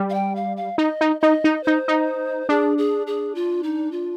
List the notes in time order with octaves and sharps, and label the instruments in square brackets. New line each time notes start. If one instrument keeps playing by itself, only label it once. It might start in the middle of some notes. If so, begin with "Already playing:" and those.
Already playing: [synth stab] G3
[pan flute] F5
G5
F5
F5
[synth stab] D#4 [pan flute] D#5
[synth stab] D#4
[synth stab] D#4 [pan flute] D#5
[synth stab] D#4
[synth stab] D#4 [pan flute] C5
[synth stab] D#4
[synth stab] D4 [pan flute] G#4
[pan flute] G#4
G#4
F4
D#4
F4